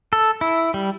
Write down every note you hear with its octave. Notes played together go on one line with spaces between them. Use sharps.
A4
E4
G3